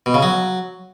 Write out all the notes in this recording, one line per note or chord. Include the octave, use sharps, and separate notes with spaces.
B2
C#3
F#3